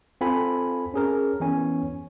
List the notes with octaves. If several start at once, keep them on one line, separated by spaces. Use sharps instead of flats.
C4 F4 A4 G#5 B5
C#4 G#4 A#4
E3 B3 C#4 C#5 G#5